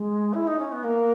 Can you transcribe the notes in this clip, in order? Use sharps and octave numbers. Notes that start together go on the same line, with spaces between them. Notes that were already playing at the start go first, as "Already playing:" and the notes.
Already playing: G#3
E4
D#4
C#4
B3
A#3